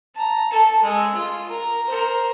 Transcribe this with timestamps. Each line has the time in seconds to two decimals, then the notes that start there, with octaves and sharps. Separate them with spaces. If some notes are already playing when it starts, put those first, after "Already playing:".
0.15 A5 A#5
0.51 A4 A5
0.82 G#3 E6
1.14 F4
1.48 A#4
1.87 A#4 C5